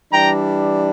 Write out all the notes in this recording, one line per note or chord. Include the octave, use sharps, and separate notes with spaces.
E3 G3 D4 G5 A#5